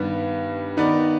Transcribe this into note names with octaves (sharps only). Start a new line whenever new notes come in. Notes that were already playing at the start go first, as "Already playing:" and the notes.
Already playing: G2 D#3 G3 B3
D#3 B3 D#4 B4 D5